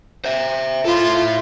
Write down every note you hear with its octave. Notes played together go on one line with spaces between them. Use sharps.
C5 E5
E4 F4 A4